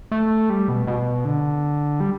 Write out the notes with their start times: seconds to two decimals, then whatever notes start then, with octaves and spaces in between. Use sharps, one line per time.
0.11 A3
0.50 G3
0.68 B2
0.87 B2
1.25 D3
2.00 G3